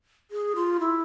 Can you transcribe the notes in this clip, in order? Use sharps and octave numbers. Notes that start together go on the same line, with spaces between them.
G#4
F4
E4